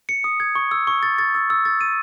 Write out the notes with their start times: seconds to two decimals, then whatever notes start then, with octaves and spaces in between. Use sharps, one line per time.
0.09 C#7
0.24 D#6
0.40 G#6
0.55 C#6
0.71 E6
0.87 C#6
1.03 A6
1.19 A6
1.35 E6
1.50 E6
1.65 A6
1.81 D#7